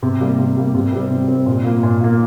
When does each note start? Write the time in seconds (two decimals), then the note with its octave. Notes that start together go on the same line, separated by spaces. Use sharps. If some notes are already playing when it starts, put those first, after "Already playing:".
0.02 C3
0.21 G3 A#3
0.39 C3
0.56 G3 A#3
0.74 C3
0.93 G3 C4
1.10 C3
1.28 G3 C4
1.46 A#2
1.64 A#3 F4
1.83 A#2
2.01 A#3 F4